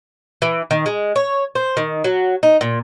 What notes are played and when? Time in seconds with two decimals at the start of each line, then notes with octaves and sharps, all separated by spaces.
0.42 E3
0.71 D#3
0.86 G#3
1.16 C#5
1.55 C5
1.77 D#3
2.04 F#3
2.43 D#4
2.61 A#2